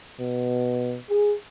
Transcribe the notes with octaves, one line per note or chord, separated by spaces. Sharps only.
B2
G#4